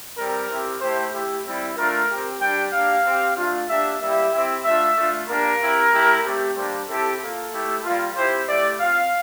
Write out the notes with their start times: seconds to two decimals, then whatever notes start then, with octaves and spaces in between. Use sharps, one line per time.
0.17 G3 C4 G4 A#4
0.49 C4 E4 G4
0.81 A3 E4 G4 C5
1.13 A3 E4 G4
1.45 G3 C4 E4
1.77 A3 D4 F4 A#4
2.09 C4 G4
2.40 G3 D4 G4 G5
2.73 A#3 D4 G4 F5
3.05 C4 G4
3.37 A3 D4 F4
3.68 A#3 D4 G4 E5
4.00 G3 A#3 E4 G4 E5
4.32 C4 E4 G4
4.65 A3 D4 F4 E5
4.97 A3 D4 F4
5.28 A#3 D4 G4 A#4
5.61 C4 E4 G4
5.93 A3 E4 G4
6.24 A3 C4 G4
6.56 G3 A#3 D4 G4 C5
6.88 C4 E4 G4 A4
7.20 A#3 F4 A4
7.52 A3 E4 G4
7.84 G3 A#3 F4
8.16 C4 E4 G4 C5
8.48 A3 E4 G4 D5
8.80 C4 F4 F5